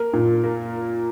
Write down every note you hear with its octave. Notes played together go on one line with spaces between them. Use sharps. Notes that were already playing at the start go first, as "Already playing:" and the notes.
Already playing: A#3 A#4
A#2
A#3